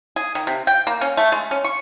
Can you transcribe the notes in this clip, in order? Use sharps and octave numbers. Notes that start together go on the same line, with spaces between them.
G#4
D#3
C3
G5
A#3
C#4
A3
G#3
C#4
C#6